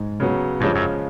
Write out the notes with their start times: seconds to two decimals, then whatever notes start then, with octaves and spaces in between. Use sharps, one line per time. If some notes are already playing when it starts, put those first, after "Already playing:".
Already playing: G#2
0.20 C#3 F#3 B3
0.60 G2 C#3 F3 G#3 C#4
0.75 F#2